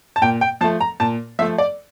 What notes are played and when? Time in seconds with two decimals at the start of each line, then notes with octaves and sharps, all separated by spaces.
0.16 A5
0.22 A#2 G5
0.41 G5
0.61 F3 A5
0.64 A3
0.81 A#5
1.00 A#2 A5
1.39 F3 E5
1.42 A3
1.58 D5